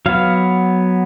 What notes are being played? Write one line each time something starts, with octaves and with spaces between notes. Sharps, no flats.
F#3 B3 F5